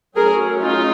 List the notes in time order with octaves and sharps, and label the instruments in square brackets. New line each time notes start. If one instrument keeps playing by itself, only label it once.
[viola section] F#3 A3 C#4 G#4 A#4
D#4 F4